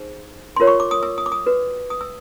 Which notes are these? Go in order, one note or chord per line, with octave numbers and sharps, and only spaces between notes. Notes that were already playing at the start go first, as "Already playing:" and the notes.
Already playing: D#4 G#4 C5
F4 A#4 C#5 C6
C#6
D6
D#6
E6
D#6
D6
D#6
F#4 B4
D#6
E6